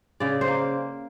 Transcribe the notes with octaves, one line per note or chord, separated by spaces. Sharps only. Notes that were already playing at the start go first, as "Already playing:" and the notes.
C#3 D5
C5
A#3